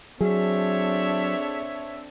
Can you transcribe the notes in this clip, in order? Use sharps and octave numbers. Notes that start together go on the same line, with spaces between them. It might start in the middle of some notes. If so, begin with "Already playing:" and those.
F#3 C4 D4 G#4 A4 C#5 E5